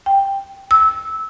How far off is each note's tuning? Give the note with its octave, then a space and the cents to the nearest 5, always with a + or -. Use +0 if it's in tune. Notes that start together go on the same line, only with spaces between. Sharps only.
G5 +10
E6 -20